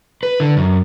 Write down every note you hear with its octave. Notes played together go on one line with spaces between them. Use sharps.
B4
D3
F#2